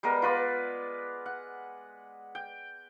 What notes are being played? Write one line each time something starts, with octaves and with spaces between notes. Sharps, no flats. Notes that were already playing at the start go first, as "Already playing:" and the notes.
G3 G#3 B3 A#4
F4 B4 D5
F#5
G5